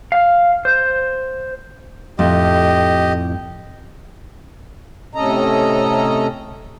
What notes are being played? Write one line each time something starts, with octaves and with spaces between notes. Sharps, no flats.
F5
C5
F2 A2 A3 G4 D#5
A2 C3 C#4 A4 D#5 A#5